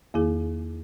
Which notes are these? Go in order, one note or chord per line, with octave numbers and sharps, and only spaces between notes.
E2 D#3 A#3 E4 G#4